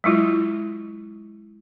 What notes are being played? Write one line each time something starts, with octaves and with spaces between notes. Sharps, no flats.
F#3 G#3 E4 F4